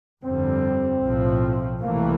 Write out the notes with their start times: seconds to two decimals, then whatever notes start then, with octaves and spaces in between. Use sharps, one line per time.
0.23 G1 F2 D3 G3 C4
1.03 B1 A2 F3
1.81 C2 C3 E3 A3 A#3